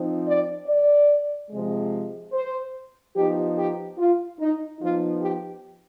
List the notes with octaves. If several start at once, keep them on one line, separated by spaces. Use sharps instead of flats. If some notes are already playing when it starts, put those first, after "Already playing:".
Already playing: F3 C4 D#4
D5
D5
C3 F3 G#3
C5
F3 B3 D#4 G4
G4
F4
D#4
F3 B3 D#4 F4
G4